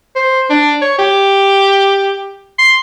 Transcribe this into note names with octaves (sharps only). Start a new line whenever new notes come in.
C5
D4
C#5
G4
C6